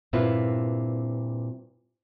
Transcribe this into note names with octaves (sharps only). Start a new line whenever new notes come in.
G2 A#2 C4 E4 F4 B4